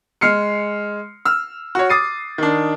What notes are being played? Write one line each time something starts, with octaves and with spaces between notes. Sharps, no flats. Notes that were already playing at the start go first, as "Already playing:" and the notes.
G#3 F6 C7 C#7
E6 F6
F#4 C#5
D6 D#6 A6 C7 D#7
D#3 D4